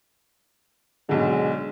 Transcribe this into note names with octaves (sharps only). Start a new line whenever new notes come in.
B1 D3 G#3